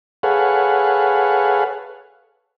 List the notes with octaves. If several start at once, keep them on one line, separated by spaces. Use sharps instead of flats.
G#4 A4 B4 C#5 F5 F#5